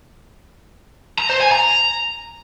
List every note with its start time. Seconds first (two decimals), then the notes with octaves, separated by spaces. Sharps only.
1.19 A#5
1.30 C5
1.41 G#5
1.52 A#5